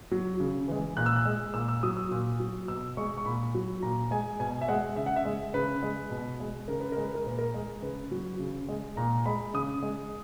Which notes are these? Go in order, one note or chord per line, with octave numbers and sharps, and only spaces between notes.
F#3
C#3
E3 G#3
A#2 F#6
E6
F#6
G#3
A#2 E6
E6
F#3 D#6
E6
A#2
F#3
B2 E6
G#3 C#6
C#6
A#2 B5
F#3
A#2 A#5
G#3 G#5
B2 G#5
E5
G#3 F#5
C#3 E5
F#5
E5
G#3
C#3 B4
G#3
B2
G#3
C#3 A#4
B4
G#3 A#4
B4
A#4
A#2 B4
A#4
G#3
C#3 B4
F#3
C#3
G#3
A#2 A#5
G#3 B5
C#3 D#6
G#3